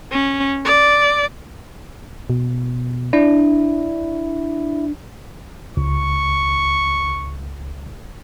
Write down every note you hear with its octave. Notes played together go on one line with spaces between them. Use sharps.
C#4
D5
B2
D4 E4
C#2 C#6